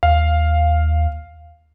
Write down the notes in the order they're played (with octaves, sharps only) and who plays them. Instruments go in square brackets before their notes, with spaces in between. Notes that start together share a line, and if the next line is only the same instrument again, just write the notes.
[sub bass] D#2 [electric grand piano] F5